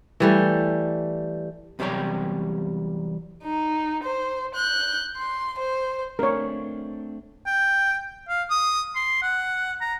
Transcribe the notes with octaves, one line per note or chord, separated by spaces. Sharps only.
E3 G3 A3
E2 C3 F#3 G3 C#5 G5
D#4
C5
F#6 G6
C6
C5
A3 C4 D4 A#4 C#5
G5
F5
D#6
C6
F#5
A#5